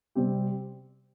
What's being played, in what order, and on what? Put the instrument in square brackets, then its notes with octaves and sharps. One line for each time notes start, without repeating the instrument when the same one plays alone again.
[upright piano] C3 G3 C4 G4